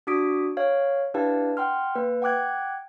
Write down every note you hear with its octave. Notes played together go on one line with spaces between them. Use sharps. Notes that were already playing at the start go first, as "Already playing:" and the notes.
D4 F#4 D6 D#6 B6 D7
C#5 F5
D4 E4 G4 B4 F5 A5
F#5 G5 C6 F6
A#3 B4
F#5 G5 D6 F#6 G#6